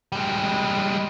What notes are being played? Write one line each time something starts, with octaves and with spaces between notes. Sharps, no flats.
G3 G#3